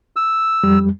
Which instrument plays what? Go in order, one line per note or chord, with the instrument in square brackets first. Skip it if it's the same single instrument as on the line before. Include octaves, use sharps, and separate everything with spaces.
[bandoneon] E6
[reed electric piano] F2 G3